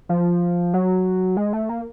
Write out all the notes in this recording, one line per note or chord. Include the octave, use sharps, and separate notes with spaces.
F3
F#3
G#3
A3
A#3